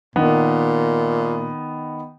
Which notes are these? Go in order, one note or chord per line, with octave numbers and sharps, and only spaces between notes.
A#2 D#3 B3